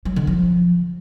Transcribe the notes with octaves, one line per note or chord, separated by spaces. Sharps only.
F#3
D3
F3